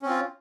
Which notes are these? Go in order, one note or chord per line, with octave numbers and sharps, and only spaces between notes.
C4 C#4 F4